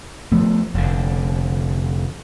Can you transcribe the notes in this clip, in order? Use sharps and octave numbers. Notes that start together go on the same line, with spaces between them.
F3 A3 B3
F1 D3